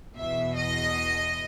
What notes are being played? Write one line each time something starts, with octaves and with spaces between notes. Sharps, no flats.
E2 B2 E5
D#5